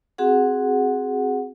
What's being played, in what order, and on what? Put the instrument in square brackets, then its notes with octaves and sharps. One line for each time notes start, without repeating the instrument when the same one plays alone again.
[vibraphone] C4 F#4 G#4 F#5